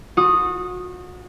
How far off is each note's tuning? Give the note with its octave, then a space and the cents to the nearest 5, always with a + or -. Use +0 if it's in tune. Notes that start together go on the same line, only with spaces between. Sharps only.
F#4 -35 D#6 +0